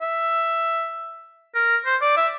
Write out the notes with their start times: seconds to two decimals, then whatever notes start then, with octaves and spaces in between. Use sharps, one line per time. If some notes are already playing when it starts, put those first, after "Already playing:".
0.01 E5
1.55 A#4
1.86 C5
2.01 D5
2.17 E5